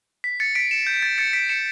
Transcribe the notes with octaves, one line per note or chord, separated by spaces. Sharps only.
B6
A6 C#7
B6 D7
C#7 E7
G6
A6
A6 C#7
B6 D7
C#7 E7